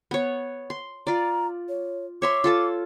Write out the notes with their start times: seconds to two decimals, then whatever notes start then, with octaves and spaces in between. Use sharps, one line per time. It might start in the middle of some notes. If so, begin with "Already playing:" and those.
0.11 B3 C#5
0.70 C6
1.07 F4 D5 A#5
1.69 C#5
2.22 C#5 E5 C6 D6
2.44 F4 A4 A5